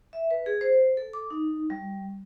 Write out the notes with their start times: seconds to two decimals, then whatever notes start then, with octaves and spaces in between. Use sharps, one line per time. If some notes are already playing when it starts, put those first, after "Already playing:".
0.13 E5
0.31 B4
0.46 G#4
0.61 C5
0.97 A4
1.13 D6
1.30 D#4
1.70 G3